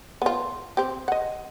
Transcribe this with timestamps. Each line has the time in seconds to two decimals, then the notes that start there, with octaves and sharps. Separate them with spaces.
0.22 B3 F4
0.77 C4 G4
1.08 D#5 F#5